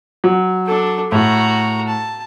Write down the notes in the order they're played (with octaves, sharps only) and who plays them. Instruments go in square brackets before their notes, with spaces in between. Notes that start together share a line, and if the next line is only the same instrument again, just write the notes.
[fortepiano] F#3
[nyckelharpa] D4 A4
[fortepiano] A2 [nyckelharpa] F#4 A#5
[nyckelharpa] A5